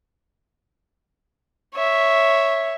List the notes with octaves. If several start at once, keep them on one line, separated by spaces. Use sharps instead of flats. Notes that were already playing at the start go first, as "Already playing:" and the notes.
C#5 E5